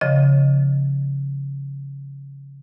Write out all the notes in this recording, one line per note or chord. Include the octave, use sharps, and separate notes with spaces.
C#3 F3 D#5